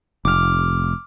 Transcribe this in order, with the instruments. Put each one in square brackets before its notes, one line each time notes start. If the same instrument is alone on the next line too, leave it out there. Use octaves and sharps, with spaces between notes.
[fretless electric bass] F1 [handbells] D6 F6